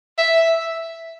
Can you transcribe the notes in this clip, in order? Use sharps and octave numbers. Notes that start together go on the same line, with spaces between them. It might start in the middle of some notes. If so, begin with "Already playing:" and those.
E5